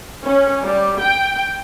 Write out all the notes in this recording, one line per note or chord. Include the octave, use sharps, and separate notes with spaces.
C#4
G3
G5